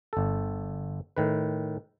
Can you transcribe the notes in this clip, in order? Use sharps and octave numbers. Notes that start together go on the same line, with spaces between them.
G1 A4
A2 D#3 B4